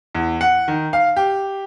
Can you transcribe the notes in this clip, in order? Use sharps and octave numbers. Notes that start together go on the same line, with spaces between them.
E2
F#5
D#3
F5
G4